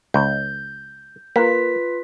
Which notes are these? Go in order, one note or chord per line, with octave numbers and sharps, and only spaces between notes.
C#2 G6
A#3 F4 B4 B6